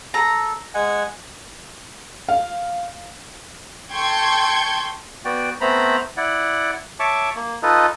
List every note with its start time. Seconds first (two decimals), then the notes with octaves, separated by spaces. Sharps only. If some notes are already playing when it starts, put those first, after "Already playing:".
0.14 A4 A#5
0.74 G#3 F#5 G#5
2.28 F5
3.93 A4 G5 C6 C#6 G6 G#6
5.25 B3 F#4 D5 G5
5.61 A3 B3 C4 C5 A#5 B5
6.17 E4 D5 F#5
7.00 C#5 E5 A5 C#6 D6
7.36 A#3
7.63 D#4 F4 A4 B4 D#5